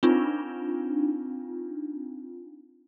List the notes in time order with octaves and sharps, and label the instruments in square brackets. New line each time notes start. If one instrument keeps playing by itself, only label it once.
[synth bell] C4 D4 D#4 F4